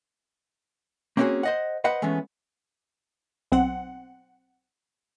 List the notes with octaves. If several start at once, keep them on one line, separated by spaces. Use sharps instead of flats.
A#3 C4 C#4 D#4 F#4 G#4
C5 D#5 F#5
B4 C5 D#5 F#5
E3 G#3 A3 B3 C#4
B1 C4 F#5